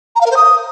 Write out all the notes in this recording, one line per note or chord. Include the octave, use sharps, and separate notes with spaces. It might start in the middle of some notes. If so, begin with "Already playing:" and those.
A#5
F5
A#4
C5
D#6